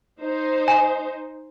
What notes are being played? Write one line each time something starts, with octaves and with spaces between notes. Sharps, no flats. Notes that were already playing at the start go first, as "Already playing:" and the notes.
D#4 C5
G#5